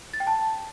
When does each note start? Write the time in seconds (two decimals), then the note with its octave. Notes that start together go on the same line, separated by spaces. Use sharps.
0.14 A6
0.20 G5
0.27 A5